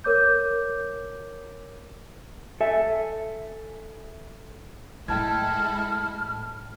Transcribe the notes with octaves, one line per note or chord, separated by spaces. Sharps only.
A#4 C#5 D6 G6
A4 E5 G#5
A2 G#3 E4 A4 G5 A5 F6 G#6